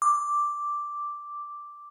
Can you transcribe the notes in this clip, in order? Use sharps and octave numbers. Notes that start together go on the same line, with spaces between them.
D6